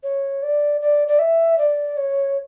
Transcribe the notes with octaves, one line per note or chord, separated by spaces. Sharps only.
C#5
D5
D5
D5
E5
D5
C#5